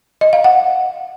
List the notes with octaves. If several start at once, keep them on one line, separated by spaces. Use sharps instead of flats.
D#5
F5
F#5